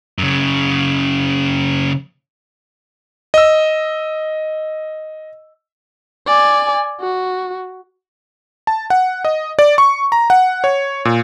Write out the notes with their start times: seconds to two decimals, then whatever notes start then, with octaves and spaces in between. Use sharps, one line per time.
0.18 F#2 C#3
3.34 D#5 E6
6.27 D5 G#5
7.00 F#4
8.67 A5
8.90 F#5
9.25 D#5
9.59 D5
9.78 C#6
10.12 A#5
10.30 F#5
10.64 C#5
11.05 A#2